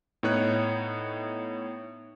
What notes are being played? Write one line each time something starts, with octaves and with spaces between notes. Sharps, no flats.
A2 B3 D#4 C#5 F#6